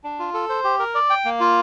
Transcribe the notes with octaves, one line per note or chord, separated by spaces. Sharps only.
D4
F4
A4
C5
G4
A#4
D5
G5
A#3
F4